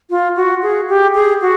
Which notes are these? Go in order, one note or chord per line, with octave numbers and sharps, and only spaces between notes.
F4
F#4
G#4
G4
G#4
F#4